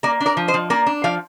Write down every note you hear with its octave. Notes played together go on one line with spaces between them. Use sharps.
A#3 A#4 D5
D4
A#4 D5
F3
C5 D#5
F3
A#3 A#4 D5
D4
F3 D5 F5